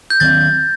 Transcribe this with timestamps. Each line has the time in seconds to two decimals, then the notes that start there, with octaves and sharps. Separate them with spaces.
0.10 G6
0.20 D#3 F#3 A3 C4 A6